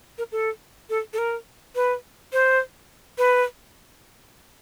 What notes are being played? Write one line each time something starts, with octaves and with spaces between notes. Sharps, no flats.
A#4
A4
A4
A4
A#4
B4
C5
B4